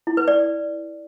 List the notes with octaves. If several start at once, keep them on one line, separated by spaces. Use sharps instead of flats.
E4
B4
D5